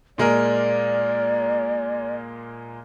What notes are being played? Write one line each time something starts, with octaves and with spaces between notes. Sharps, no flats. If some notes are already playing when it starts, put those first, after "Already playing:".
A#2 G#3 A#4 D5